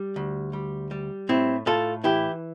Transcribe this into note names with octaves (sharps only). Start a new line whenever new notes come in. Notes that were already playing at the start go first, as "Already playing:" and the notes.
Already playing: G3
D2
G3
G3
A2 C4 E4
A2 F4 A4
E3 E4 G4